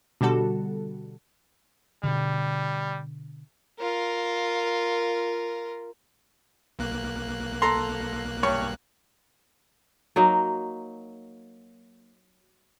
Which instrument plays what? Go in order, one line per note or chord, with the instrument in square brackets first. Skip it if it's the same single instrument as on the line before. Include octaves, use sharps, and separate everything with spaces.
[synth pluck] B2 D3 G3 F#4 A4
[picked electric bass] B2 D3 [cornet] G3
[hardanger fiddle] F4 A#4
[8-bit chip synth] B1 A#3 F#6
[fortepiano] A4 A#5 C6
G2 C#5
[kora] F#3 A#3 D#4